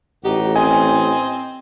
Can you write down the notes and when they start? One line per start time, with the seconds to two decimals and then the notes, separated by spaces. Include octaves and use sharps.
0.25 A1 D#4 F#4 G4
0.56 C4 C5 D#5 G#5